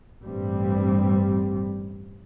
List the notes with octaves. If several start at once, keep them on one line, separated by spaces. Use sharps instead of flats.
A1 G2 G3 C4